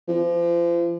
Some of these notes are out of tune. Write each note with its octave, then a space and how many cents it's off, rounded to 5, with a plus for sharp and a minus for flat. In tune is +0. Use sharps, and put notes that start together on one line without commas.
F3 -35